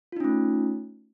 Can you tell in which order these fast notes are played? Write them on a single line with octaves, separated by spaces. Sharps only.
F4 D#4 C#4 A3